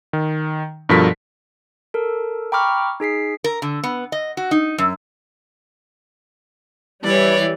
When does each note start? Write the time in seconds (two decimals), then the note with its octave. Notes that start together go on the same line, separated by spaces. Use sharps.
0.13 D#3
0.89 G2 B2 F3 A4 A#4 B6
1.94 A4 A#4
2.52 G5 A#5 B5 C#6 D6 F6
3.00 D#4 G#4 B6 C7
3.44 A#4
3.62 D3
3.83 B3
4.12 D#5
4.37 F#4
4.51 D#4
4.78 F#2
7.04 E3 G3 C#5 D5